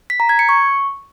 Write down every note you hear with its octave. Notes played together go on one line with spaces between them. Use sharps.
B6
A#5
G#6
C#7
C#6